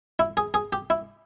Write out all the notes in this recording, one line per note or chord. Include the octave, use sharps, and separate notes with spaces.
E4
G#4
G#4
G4
E4